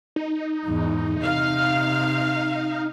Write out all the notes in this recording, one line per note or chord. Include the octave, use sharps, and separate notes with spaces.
D#4
E2 G#2
C3 F5